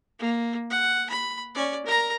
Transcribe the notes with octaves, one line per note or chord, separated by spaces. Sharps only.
A#3
F#5
B5
C#4 D5
A#4 A#5